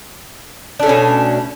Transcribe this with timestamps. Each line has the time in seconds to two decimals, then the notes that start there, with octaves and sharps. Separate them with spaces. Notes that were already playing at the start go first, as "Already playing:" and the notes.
0.80 D4
0.83 A3
0.86 C#4
0.89 B2